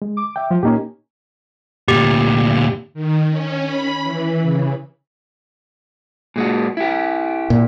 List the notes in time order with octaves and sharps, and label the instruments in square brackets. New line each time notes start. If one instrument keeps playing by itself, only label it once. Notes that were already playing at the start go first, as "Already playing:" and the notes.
[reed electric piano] G#3
[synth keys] D6
[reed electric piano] E5 G5
[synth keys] F3
[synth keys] A#2 A#3 C#4 [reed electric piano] D#4 G4
[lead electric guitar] D2 A#2 [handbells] G4
[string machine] D#3
C#4
B5
E3
C#3
[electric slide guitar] A#2 G#3 F#4
E4 G4
[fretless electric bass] A#2